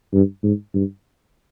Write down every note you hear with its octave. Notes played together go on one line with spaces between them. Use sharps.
G2
G#2
G2